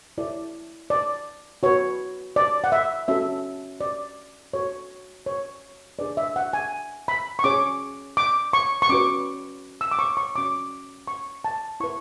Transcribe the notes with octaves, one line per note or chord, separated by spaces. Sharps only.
E4 A4 C#5 D5
D5
F#4 B4 C#5
D5
F#5
E5
C#4 F#4 A4 E5
D5
F#4 A4 C#5
C#5
D4 G#4 B4 D5
E5
F#5
G#5
B5
C#6
C#4 G#4 C#5 D6
D6
C#6
C#6
C#4 F#4 B4 D6
E6
D6
C#6
C#6
C#4 F#4 C#5 D6
C#6
A5
E4 B4 C#6